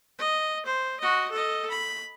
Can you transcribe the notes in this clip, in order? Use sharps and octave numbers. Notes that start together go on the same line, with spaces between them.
D#5
C5
F#4 D#5
A4 D#5
B5